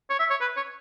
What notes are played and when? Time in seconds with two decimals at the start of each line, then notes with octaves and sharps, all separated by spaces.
0.10 C#5
0.20 E5
0.30 C#5
0.41 B4
0.57 C#5